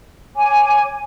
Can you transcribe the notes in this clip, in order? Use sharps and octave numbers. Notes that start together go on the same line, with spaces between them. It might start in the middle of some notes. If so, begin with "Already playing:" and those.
C#5 G#5 D6